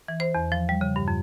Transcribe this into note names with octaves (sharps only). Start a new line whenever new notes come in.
E3
C5
E2
F3
G3
C#3
G2
F2